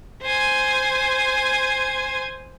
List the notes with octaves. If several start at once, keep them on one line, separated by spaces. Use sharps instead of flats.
C5 G#5